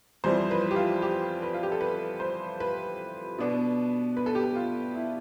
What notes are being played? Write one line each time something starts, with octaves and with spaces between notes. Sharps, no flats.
F2 E3 G3 C5
B4
G4
F4
G4
B4
F4
G4
A4
B4
C5
B4
B2 B3 D4
B4
A4
G4
A4
F4
E4